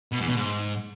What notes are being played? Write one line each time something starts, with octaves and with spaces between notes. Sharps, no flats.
B2
E2
B2
G#2